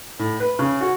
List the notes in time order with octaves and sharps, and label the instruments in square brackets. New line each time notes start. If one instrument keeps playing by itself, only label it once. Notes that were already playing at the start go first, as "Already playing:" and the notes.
[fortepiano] A2
B4
C#3
F#4